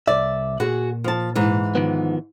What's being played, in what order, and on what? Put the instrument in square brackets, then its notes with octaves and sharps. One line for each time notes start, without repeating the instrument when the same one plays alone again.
[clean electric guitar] C2 E5 [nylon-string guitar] D5
[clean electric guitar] A#2 [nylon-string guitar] F#4 G#4
[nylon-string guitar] F3 A5
G#2 E3
[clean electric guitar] D#3 F3 B3